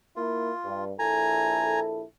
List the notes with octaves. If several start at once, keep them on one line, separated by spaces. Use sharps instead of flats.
A#3 E4 F4
G2
A#1 E4 A4 G#5 A#5